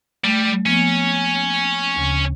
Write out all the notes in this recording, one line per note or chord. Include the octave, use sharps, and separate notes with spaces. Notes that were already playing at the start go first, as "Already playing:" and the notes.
G3 A3
F3 A#3 B3 C#4
G#5
D2 C#3